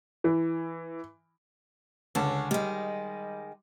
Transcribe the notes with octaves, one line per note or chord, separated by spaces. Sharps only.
E3
C#2 D3 C#4 A5
D#3 G3 G#3